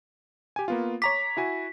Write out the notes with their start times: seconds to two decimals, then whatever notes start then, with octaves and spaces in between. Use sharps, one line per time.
0.56 G4 G#5
0.68 A#3 B3 F4
1.02 C#5 A#5 D6 B6
1.37 E4 F#4 G#5